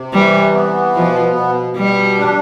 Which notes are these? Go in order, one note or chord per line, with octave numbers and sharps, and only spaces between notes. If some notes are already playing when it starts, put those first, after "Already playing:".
Already playing: C3
E3 G3
B3
B2 F3
B2
B2 G3
D4